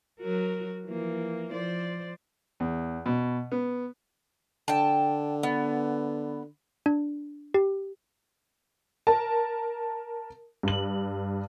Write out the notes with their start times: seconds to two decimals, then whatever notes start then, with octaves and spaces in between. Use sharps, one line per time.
0.20 F#3 F#4 A#4
0.85 E3 F3 A#3
1.51 F3 C5 D5
2.60 E2
3.06 B2
3.52 B3
4.68 D3 G5 A5
5.43 B3
6.86 D4
7.54 G4
9.07 A#4 A5
10.63 G2 F#7